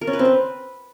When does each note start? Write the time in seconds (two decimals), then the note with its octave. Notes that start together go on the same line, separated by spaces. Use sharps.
0.01 A#4
0.07 C#4
0.13 B4
0.19 C4
0.25 B4